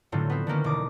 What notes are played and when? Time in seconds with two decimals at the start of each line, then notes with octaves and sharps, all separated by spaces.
0.12 A2 D3 F#3 A3 C4 F4
0.30 B3 C4
0.47 D3 D#3 A#3 C#4
0.64 E1 D6 D#6